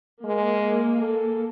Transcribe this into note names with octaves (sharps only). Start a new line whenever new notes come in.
G#3 A#3
A4